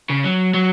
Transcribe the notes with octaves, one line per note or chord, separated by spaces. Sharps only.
C#3
F#3
F#3